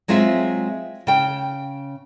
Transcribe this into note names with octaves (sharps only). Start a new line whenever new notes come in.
F#3 G#3 C4 F4 D#5 E5
C#3 G5